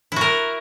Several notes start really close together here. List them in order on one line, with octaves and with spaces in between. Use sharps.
E4 F#4 A#4